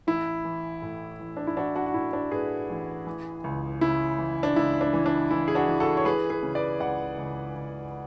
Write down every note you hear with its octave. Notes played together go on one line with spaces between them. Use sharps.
A1 E4
E3
A2
E3
D4
E4
E3 D4 F#4
D4 F#4
F#4
A2 E4
D4
A2 G#4 B4
A1
E3
C#2
C#3 E4
E3
D4
C#2 E4
D4
E3
D4
E3 E4
G#4
D4 F#4
E3
F#4 A4
C#5
E3 G#4 B4
G#4 B4
C#3
B4 D5
C#2 D5 F#5
C#2
C#2